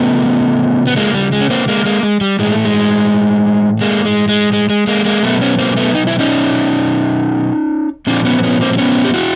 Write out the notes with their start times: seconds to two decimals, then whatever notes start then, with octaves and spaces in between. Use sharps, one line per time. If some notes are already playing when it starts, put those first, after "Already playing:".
Already playing: C#3 F3 A3 B3
0.87 B3
0.96 G#3 A#3
1.14 G3
1.32 G#3
1.41 C#4
1.50 A#3 C4
1.68 G#3 A#3
1.85 G#3 A#3
2.03 G#3
2.21 G3
2.39 A2 E3 G#3
2.52 A3
2.65 G#3
3.81 G#3 A#3
4.05 G#3
4.29 G#3
4.53 G#3
4.70 G#3
4.87 G#3 A#3
5.05 G#3 A#3
5.23 B2 F#3 A3 B3
5.41 B3 C#4
5.58 A#3 C4
5.77 A3 B3
5.95 D#4
6.07 E4
6.19 C#4 D#4
8.07 A#2 F3 C4 D4
8.25 B3 C#4
8.38 C4
8.43 B3 C#4
8.61 A#3 C4
8.73 C4
8.78 B3 C#4
9.04 G4
9.14 E4 F#4